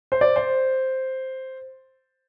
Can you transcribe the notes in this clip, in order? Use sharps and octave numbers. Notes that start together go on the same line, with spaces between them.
C5
D5
C5